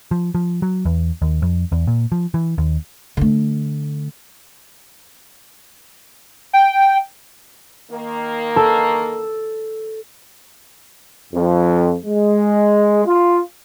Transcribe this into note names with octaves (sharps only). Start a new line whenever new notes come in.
F3
F3
F#3
E2
D#2
F2
E2
A#2
F3
E3
D#2
D3 A3
G5
D#3 A#3
A4
F2
G#3
F4